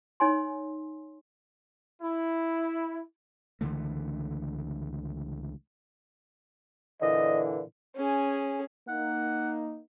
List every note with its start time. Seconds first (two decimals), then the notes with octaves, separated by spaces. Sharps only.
0.20 D#4 C#5 G#5 C6
2.02 E4
3.61 C#2 D3 E3 A3
7.02 A#2 D3 E3 D#5
7.96 C#4 G#4
8.88 A#3 D#4 F#5